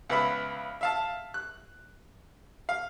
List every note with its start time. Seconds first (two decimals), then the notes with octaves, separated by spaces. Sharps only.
0.09 C#2 B3 E5 B5
0.81 E5 F5 A5
1.34 F#6
2.69 F5